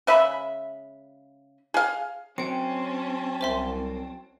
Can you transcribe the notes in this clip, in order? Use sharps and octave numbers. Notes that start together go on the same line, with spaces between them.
C#3 G#3 E5 B5
G#4 F5
F#3 C4 C#4 G5 A5 C#7
C2 C5 E5 C6